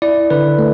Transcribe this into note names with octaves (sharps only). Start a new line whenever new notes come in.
E4 D5
D3 B4
A3